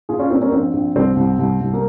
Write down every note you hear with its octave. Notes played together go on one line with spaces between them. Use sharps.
A#2 F4 G#4
C#4 F4
A#2 C4
A#3 C#4
A#1 C4
A#1
C2 C4
C2
C2
C2
A#3